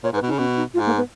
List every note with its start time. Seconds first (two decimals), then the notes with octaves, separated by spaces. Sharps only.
0.03 A#2 C#5
0.13 G#2 B4
0.22 B2
0.27 D#4
0.31 C#3
0.39 B2 C#4
0.57 D#4
0.74 G#2 F4
0.86 A#3
0.97 B3